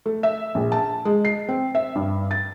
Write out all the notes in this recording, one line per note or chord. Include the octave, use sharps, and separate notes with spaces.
A3
E5
A#1
A5
G#3
C7
C4
E5
G2
A6